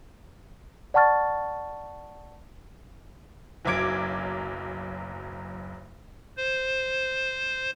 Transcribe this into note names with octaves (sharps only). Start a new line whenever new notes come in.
D5 F#5 A5 C#6 F6 A6
F#1 B1 F#3 D6 G#6 D7
C5